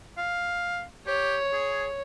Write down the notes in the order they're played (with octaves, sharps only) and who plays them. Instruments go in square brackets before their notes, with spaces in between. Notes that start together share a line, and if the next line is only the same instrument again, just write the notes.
[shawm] F5
[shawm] G4 [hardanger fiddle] C#5
[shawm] G#4